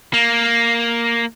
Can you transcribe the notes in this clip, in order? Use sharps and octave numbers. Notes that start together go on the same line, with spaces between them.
A#3